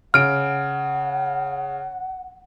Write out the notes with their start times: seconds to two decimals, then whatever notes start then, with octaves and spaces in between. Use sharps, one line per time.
0.14 C#3 F#5 F6 D7